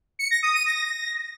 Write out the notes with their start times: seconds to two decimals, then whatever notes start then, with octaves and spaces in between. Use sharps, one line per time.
0.19 C#7
0.31 A#6
0.42 D#6
0.54 D#7
0.66 A#6